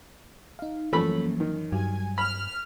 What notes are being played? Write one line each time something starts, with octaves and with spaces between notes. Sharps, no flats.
D#4 F5
F#2 E3 F3 A3 A#3 C#4 B5
D#3
G2 F#3 G3 G#5
B5 F6